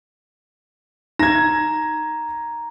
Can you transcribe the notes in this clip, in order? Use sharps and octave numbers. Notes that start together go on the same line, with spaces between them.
D#4 A#5 G#6 A#6